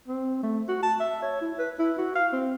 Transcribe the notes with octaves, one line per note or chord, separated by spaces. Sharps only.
C4
A3
F#4
A5
E5
C#5
E4
B4
E4
F#4
F5
C4